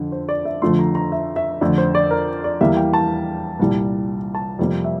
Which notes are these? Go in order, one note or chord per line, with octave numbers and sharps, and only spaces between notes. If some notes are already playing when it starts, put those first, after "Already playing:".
Already playing: F2 D3
C5
D5
E5
F2 D3 F3 A3 C6
A#5
A#5
E5
E5
F2 D3 A3 D5
C5
D5
A#4
D5
E2 E3 G3 A#3 E5
G5
A5
C2 A#2 G3
A5
F2 C3 G3 A#3
E5